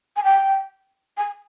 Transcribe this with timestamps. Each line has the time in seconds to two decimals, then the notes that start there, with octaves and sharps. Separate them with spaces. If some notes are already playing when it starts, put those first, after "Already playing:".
0.16 G#5
0.24 G5
1.17 G#5